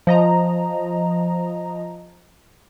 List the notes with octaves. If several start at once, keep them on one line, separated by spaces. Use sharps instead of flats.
F3 D#5 A#5